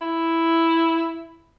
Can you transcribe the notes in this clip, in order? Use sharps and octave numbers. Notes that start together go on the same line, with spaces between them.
E4